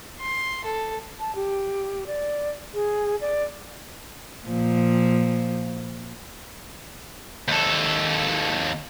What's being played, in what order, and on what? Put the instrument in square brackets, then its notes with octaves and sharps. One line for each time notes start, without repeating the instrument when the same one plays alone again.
[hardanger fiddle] C6
A4
[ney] A5
G4
D5
G#4
D5
[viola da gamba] A#2 F3
[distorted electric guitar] D#2 A4